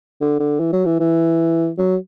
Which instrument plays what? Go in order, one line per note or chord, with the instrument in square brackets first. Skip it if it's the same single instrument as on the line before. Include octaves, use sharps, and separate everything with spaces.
[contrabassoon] D3
D3
E3
F#3
E3
E3
F#3